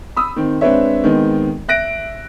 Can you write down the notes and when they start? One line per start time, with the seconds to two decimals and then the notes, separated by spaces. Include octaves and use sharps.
0.16 B5 D#6 E6
0.36 D#3 C4
0.61 G#3 C4 D4 B4 C#5 E5
1.04 D#3 G#3 B3 C4
1.68 E5 F#6 A#6 D7